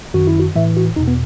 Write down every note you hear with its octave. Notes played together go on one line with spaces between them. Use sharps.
F#2 D#3 F#4
E4
F#4
A2 E3 E5
F#4
E2 B2 D#4
B3